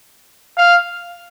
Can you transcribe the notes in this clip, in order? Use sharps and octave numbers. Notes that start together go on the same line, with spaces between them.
F5